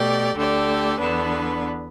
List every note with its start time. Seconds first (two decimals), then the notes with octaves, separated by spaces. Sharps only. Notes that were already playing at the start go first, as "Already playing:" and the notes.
Already playing: B2 A3 G4 D5
0.35 D2 D3 A3 G4 D5
1.00 E2 D3 B3 D4 B4